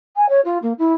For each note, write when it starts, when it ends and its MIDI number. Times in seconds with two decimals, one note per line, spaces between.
0.16 0.28 80
0.29 0.40 73
0.45 0.58 65
0.62 0.73 58
0.78 0.94 64